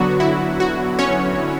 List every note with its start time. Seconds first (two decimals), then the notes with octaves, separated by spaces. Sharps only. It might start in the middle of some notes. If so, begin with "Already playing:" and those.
Already playing: D3 F#3 B3 F#4
0.20 E4
0.60 F#4
0.99 C#4 C#5